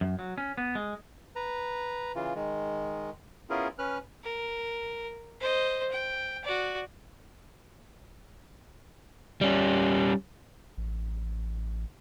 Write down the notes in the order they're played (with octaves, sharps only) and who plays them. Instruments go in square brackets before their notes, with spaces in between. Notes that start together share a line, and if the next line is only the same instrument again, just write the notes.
[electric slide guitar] F#2
F#3
C#4
B3
G#3
[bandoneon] B4 A#5
C#3 E3 F4
D#3 G#3
B3 C#4 E4 F4 G#4 A#4
C#4 B4 F6 F#6
[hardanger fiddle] A#4
C5 D#5
G5
F#4 D5
[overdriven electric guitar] G3 C#4
[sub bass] A1